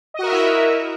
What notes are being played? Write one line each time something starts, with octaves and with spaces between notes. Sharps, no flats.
E4 F#4 A#4 D#5 E5